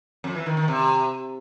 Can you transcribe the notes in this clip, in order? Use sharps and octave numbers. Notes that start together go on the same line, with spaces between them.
F2
E3
D#3
D#3
C3